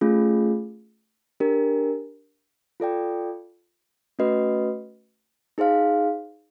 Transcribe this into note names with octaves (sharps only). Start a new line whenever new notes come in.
A3 C#4 F4 G#4
D4 G4 A#4
F4 A4 D5 G5
A3 C#4 F#4 B4 D#5
D#4 G#4 C5 F5